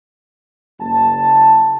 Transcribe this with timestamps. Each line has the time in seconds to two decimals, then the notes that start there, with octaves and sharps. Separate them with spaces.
0.80 F#1 A5